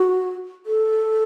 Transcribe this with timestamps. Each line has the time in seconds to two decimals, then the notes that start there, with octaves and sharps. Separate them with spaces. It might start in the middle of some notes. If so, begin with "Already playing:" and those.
Already playing: F#4
0.66 A4